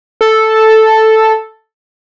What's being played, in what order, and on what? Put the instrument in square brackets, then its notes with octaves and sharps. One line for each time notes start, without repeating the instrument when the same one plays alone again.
[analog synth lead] A4